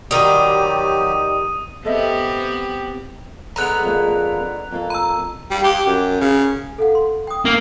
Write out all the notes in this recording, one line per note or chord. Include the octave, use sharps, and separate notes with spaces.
D#3 F#3 G3 G4 D#6 D#7
B3 C4 G4 A4 D#5 E5
D3 G#3 B3 A#5 F#6 F7
F2 A#3
F2 A#3 A4
A#5 E6
G3
G4
F#2
C#3
A4 F5 F#5
C6
G5 D#6
A#3